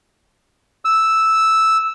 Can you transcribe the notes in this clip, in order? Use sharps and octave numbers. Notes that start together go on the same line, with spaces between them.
E6